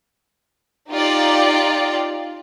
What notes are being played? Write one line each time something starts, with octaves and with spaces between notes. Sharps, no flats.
D#4 F4 G4 D5